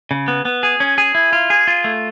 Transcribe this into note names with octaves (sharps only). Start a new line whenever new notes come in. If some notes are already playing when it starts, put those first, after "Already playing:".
C#3
B3
B3
G#4
C#4
G#4
E4
F4
G#4
F4
A3